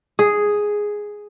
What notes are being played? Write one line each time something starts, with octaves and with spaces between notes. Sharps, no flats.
G#4